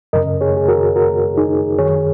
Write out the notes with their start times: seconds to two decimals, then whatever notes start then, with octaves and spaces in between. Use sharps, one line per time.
0.13 F#2 C#3 A#4 D#5
0.41 G#4 C#5
0.57 G#4
0.68 F#4 A#4
0.96 F#4 A#4
1.37 D#4 G#4
1.78 F#2 D#3 G#4 C#5